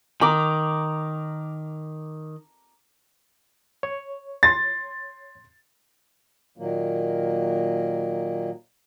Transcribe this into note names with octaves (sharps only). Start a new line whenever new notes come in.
D#3 A#5 D6
C#5
C6 A6
A#2 D#3 F#3 A#3